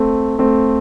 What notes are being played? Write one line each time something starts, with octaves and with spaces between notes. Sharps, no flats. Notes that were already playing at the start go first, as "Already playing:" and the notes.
Already playing: A3 C4
A3 C4